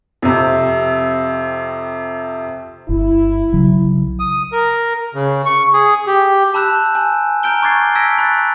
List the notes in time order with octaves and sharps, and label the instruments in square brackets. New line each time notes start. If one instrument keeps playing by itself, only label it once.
[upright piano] F2 C3
[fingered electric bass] G1 [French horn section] E4
[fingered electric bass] B1 C#3 F#3
[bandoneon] D#6
A#4
C#3
C#6
G#4
G4
[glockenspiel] A5 B5 E6 F#6 G6 E7
G#5
G#5 A#5 F6 G6 D7 G7
C#6 D6 F#6 G#6 A6 C7
A5 E6 G#6 A#6 B6 D7
B5 F#6 A6